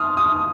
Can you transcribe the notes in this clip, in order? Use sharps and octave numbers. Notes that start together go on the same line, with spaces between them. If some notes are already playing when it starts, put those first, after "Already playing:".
Already playing: C6 D#6 F6
D#6